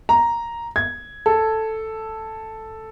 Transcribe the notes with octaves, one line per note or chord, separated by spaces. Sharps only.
A#5
G#6
A4